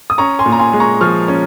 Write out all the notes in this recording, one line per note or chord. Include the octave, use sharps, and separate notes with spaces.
D#6
C#4 A#5 C#6
G#5 C6
A#2
A#5
G#5 C6
G#3
A#5 C#6
F3 C#6 F6
C#4